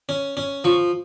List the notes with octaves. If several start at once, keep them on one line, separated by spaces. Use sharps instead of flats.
C#4
C#4
F3 C#6